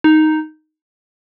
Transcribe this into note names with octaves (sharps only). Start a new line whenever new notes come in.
D#4